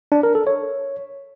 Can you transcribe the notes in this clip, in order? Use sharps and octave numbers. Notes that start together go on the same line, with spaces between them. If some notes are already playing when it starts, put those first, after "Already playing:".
D4
A#4
A4
C#5